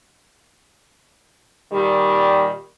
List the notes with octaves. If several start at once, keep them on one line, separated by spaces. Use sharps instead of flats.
A#2 D#3 G3